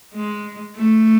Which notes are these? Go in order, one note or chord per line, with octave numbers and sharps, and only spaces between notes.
G#3
A3